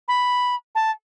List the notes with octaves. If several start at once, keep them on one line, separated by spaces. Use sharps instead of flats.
B5
A5